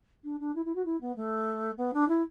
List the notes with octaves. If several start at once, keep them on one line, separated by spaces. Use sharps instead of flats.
D4
D4
E4
E4
F#4
E4
B3
A3
B3
D4
E4